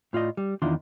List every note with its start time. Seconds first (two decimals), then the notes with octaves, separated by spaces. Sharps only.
0.13 A2 F4 D5 D#5
0.37 G3
0.62 E2 D#3 D4 E4 F4 C6